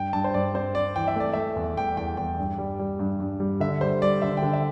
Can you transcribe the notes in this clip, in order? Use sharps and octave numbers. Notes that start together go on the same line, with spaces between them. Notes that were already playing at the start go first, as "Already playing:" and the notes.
Already playing: G2 G5
G2 A5
C5
G2 D5
C4 C5
C4 D5
E3 G5
E5
A3 D5
A3 E5
E2
E2 G5
E2 G5
E2 G5
G2
G3
G3
G2
G2
G3
D3 E5
G3 C5
G3 D5
D3 E5
G5
D3
E5